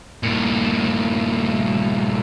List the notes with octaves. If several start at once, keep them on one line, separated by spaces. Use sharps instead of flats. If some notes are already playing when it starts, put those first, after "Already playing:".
G2 A#2